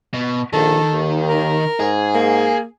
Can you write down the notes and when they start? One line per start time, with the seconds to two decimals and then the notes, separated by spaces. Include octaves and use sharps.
0.14 B2
0.53 A#1 D#3 A4
0.92 D#2
1.28 A#4
1.80 G#2 G#4
2.15 A#3